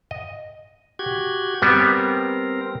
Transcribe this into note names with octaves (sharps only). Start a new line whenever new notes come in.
D#5
F#4 G4 G#6
G3 B3 C4 A#4